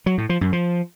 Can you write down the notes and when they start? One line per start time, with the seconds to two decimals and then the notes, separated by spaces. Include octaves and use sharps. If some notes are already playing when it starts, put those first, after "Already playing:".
0.06 F#3
0.18 A2
0.29 F3
0.41 F#2
0.53 F3